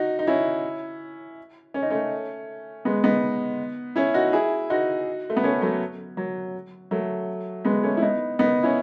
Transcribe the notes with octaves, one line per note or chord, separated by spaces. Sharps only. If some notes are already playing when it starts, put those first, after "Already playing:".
Already playing: D#4 F#4
D#4
C#4 E4
C#4
D#4
A3 C#4
G#3 B3
B3 D#4
C#4 E4
D#4 F#4
E4 G#4
D#4 F#4
A3
B3
A3 C#4
F#3 A3
F#3
F#3 A3
G#3 B3
A3 C#4
E4
B3 D#4
B3 D#4
C#4 E4